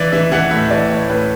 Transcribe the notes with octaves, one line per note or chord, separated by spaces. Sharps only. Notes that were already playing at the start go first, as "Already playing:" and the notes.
Already playing: E3 D5
E3 E5
E3 F#5
A2 E5
E3 D5
A2 C#5
A2 B4